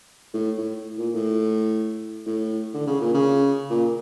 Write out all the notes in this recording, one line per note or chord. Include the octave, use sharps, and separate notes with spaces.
A2
A2
A#2
A2
A2
D3
C#3
A#2
C#3
A#2